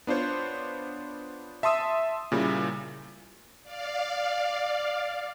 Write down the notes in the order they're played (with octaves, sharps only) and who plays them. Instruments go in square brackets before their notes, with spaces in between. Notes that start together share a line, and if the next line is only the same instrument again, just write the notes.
[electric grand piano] B3 D4 F4 C5 C#5
E5 A5 C6 D#6 E6
A#2 C#3 G3 E4
[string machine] D5 F5